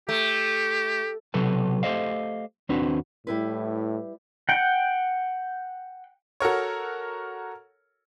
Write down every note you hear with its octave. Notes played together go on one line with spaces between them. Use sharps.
A3 G4
B1 C3 F#3 A4 B4 A5
A3 G4 A4 C5 D#5 F5
D#2 C4 D4 F#4 B4
A2 G3 E4 B4
F#5 G5
F#4 A4 A#4 C#5